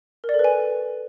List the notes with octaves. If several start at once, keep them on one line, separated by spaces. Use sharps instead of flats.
A#4
D5
A4
B4
G#5